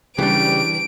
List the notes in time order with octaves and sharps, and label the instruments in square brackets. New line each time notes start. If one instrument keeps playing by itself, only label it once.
[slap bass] C#3 G3 [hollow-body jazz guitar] E3 D4 [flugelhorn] G4 [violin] D7